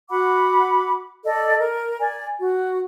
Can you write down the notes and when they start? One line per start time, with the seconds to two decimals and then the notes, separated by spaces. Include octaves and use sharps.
0.10 F#4 F#5 B5 D6
1.24 A4 D5 D#5
1.58 A#4
1.99 D5 G#5
2.40 F#4